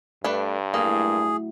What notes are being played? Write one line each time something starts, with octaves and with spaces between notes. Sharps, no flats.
G2 A3 D4 B4
A2 F#3 A#3 G#4